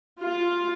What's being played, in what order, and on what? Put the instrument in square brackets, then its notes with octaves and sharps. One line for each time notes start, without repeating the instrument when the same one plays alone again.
[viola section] F4